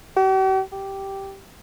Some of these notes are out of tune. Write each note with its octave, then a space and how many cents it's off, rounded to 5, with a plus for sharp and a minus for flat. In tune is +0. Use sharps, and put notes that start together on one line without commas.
G4 -45
G4 -5